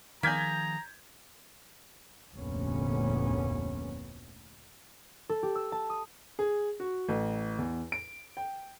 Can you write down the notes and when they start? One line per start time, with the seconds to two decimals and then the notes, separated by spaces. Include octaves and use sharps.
0.23 D#3 F3 A#3 G#4 A#5 G6 G#6 B6
2.34 F1 D2 A#2 B3 C#4
5.29 A4
5.43 G4
5.55 E6
5.72 A5
5.90 D#6
6.39 G#4
6.80 F#4
7.09 A1
7.58 E2
7.92 D7
8.37 G5